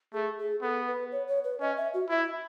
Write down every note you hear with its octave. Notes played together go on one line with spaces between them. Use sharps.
A3 G#4
G#4
B3 A4
B4
C#5
C#5
B4
C#4 D#5
E5
F#4
E4 E5